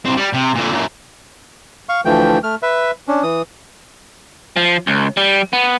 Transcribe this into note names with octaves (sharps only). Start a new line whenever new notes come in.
C2 C4
G3
C3
A#2 D3
F#2 A#2
F5 C#6
D2 E3 F3 A3 G5
A3 F6
B4 E5
C#4 D4
E3 D#6
F3
C#2
G3
B3